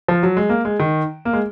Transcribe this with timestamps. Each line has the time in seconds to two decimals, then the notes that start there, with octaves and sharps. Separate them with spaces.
0.08 F3
0.23 F#3
0.37 G#3
0.49 A#3
0.65 G#3
0.79 D#3
1.25 A#3
1.33 G#3